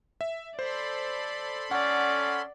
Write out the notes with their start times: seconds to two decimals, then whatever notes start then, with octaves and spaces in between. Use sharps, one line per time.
0.21 E5
0.59 A4 C5 D5 B5 C6
1.71 C#4 D5 F#5